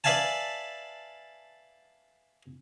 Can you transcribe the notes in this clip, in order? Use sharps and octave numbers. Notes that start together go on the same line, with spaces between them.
B4 D5 E5 F5 G#5 A5